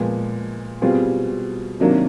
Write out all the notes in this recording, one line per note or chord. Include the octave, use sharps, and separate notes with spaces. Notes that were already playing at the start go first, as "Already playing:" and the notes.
Already playing: A#2 F3 G#3 B3
B2 G3 C4 F4 G#4
C3 D#3 F#3 A#3 D4